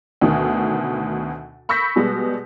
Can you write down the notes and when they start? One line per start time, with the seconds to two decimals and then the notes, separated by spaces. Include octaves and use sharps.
0.21 D2 B2 D#3
1.69 B5 C#6 E6 G6 A#6 B6
1.96 B2 G3 G#3 B3